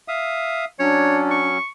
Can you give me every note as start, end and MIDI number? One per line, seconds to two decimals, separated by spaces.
0.08 0.65 76
0.08 0.65 77
0.08 0.65 87
0.79 1.58 54
0.79 1.58 61
0.79 1.48 62
0.79 1.19 73
1.31 1.68 85